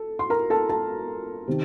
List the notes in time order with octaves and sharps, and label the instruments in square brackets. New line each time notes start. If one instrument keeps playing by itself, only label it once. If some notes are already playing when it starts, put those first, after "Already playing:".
Already playing: [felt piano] A4
C6
A#4 A#5
A4 A5
A4 A5
C3 D#3